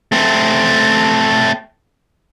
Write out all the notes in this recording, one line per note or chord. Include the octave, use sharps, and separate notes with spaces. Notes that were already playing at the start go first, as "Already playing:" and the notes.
A3 C4